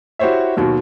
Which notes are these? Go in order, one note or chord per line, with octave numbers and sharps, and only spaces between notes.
E4 F#4 G4 C5 C#5 E5
D#2 B2 D#3 F#3